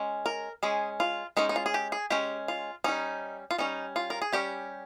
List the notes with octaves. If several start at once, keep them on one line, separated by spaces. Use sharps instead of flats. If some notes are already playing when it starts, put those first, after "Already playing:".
Already playing: G#3 C#4
A#4
G#3 C#4 G#4
F4
G#3 C#4 D#4
D#4
F4
G#4
G4
G#4
G#3 C#4 G4
F4
G3 C#4 D#4
F4
G3 C#4 D#4
F4
A#4
G#4
G3 C#4 G4